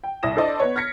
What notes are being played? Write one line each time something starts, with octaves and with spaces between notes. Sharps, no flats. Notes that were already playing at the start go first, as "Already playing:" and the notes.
G5
C2 E4 D#6 A#6 E7
D4 E4 A4 C5 D5 D#5
B3 B4 C#5
F6 G#6 A#6 B6 C#7